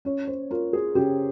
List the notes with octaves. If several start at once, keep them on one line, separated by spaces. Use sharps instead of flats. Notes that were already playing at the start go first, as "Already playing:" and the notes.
C#4 C#5
C5
F4 A#4
G#4
C#3 G4